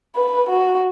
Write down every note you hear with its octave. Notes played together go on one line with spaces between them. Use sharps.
B4
F#4